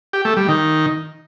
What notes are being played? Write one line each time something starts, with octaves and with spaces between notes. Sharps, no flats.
G4
A3
G3
D#3